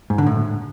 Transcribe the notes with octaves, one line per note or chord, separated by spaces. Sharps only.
G#2
D3
A2